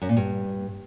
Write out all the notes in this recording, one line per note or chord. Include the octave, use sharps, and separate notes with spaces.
F#2
A#2
G2